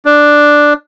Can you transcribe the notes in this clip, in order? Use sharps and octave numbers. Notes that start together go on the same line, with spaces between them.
D4